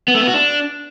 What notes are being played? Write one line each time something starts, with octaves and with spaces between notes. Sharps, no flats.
B3
A3
B3
F#4
D4